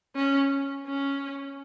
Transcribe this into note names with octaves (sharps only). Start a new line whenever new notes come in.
C#4
C#4